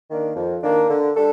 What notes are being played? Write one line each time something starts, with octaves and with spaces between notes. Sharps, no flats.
D#3 A#3 D4
F2
D#3 A#3 D4
D3
G3 D4 A4